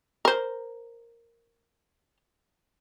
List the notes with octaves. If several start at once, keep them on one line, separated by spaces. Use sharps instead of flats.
A#4 C5